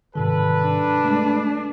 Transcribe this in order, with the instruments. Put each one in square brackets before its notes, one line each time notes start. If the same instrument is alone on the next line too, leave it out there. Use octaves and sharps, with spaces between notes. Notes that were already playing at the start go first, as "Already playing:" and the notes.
[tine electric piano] G#2 C3 D#3 [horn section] G3 A4 B4
[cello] D4
[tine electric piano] G#3 A3